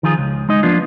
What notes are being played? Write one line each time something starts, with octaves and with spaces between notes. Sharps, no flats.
D#3 F3 F4 G#4
C#2
G#3 D#4 D#5
F3 A#3 B3 D4 F4